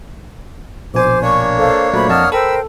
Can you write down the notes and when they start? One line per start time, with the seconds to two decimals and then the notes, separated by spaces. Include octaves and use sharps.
0.94 A#1 B2 C5 G#5 D6
1.22 A#3 D4 C#5 C#6
1.58 A4 C5 F5
1.93 A#2 F#3 A3 C5 B5
2.09 F2 D#5 F#5 A5 D#6 F6
2.32 A4 A#4 C5 G5 B5 E6